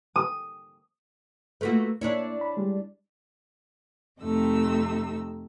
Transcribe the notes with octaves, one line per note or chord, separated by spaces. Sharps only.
D#6
A3 A#3 F4 F#4 B4
A#3 D4 E4 C#5
B5
G3 G#3
F2 C3 A3 D#4 E6